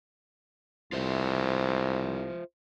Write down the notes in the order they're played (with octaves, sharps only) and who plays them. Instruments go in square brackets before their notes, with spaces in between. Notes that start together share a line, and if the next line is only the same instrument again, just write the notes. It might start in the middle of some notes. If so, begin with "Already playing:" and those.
[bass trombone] C2 [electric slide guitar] F4 C5 E5